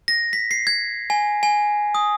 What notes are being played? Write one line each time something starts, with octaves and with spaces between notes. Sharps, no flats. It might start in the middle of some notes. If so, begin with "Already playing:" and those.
A#6
B6
C7
G#6
G#5
G#5
D#6